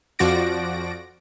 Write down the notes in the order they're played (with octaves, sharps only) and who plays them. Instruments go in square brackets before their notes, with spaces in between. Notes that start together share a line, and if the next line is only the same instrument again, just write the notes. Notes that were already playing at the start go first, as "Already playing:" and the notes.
[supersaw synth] F2 F3 F#4 D5 A#6 D7